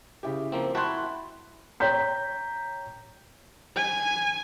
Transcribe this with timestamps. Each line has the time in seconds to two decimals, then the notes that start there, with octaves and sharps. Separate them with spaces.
0.23 C#3 E4 G4
0.52 F3 A#3 C4
0.75 E4 F#4 G5 A5 C6 F#6
1.80 C#5 G5 A#5 G6 B6
3.76 G#5